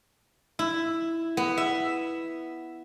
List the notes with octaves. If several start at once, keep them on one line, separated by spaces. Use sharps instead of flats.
E4
B3
E5